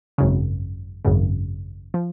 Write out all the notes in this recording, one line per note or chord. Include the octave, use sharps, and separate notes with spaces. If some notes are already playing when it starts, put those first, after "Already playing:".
G#1 F#2 C#3
G#1 F#2 C#3
F3